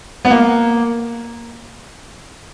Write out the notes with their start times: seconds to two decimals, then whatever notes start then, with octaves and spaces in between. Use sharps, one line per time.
0.25 B3
0.30 A#3